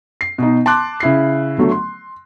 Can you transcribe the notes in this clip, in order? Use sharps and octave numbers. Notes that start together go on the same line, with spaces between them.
C7
B2 D#4
A5 C6 D6 F#6
C#3 E4 C7
D3 F#3 A3
C6